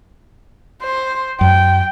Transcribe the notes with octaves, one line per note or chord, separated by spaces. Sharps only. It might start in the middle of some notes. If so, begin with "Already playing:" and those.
C5
F#2 G5